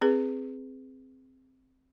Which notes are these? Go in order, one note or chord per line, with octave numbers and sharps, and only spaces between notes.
C4 G#4 B4